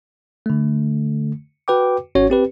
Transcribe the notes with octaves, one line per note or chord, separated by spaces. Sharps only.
D3 A3
F#4 B4 G5 D6
G#1 C#4 F#4 C#5
C4 G4 B4